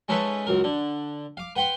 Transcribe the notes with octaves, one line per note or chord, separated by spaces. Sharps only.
G#3 C#4 D#4 A4 B4 E5
C#2 F#2 A#4
D3
F5 D6
B4 F#5 G5 B5 C6